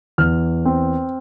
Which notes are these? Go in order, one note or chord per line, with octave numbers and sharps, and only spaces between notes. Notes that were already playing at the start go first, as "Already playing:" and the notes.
E2 F6
C4